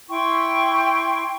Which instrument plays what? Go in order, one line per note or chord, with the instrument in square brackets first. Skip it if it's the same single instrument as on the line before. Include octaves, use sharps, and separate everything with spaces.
[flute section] E4 G5 C6 C#6